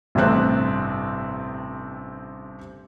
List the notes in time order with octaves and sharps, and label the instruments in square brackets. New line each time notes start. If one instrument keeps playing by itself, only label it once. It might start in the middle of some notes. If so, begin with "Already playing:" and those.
[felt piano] A1 G2 C3 A3 C4 F#6